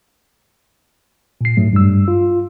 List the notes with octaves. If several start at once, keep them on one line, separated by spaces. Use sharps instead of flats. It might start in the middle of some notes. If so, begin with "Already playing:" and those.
A#2 C7
G#2 F#3 A3
G2 G3 E6
F4